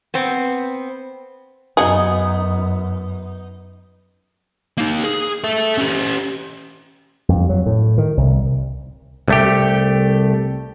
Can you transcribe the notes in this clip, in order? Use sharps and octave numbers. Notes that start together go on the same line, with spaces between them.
B3 C4
F#2 B3 D#4 F#4 G#4
A#3 D#4
G#4
A4 E5
C#4 G4
F2
F#3
A2
D#3
C2
C2 A3 G4